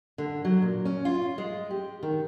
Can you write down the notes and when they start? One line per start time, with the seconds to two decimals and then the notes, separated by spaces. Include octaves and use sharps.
0.18 D3
0.45 F#3
0.62 A#2
0.85 C#4
1.05 F4
1.38 G#3
1.71 G4
2.03 D#3